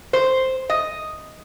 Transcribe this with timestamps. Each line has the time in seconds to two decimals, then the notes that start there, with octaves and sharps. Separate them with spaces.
0.13 C5
0.70 D#5